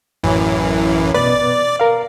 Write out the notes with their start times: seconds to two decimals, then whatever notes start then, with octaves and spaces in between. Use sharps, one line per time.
0.23 A1 F#2 E3
1.14 B2 B3 B4 D5
1.80 A#4 F5